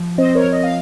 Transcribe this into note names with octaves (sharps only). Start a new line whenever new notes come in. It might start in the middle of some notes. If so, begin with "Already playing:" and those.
Already playing: F3
C4 C5 D#5
A#4 C#5
F3
D#5
F5